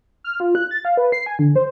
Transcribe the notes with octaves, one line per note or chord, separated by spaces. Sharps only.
F6
F4
F#6
A6
F5
B4
C7
G#5
D3
C5